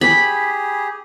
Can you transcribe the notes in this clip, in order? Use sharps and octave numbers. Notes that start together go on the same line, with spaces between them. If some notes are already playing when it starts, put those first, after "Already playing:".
G4 G#4 B5